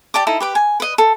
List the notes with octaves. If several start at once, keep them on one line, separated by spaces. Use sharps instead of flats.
G4 D5 A5 D6
D#4 E4 A4
G4 B4 D6
G#5
B4 D#5
A4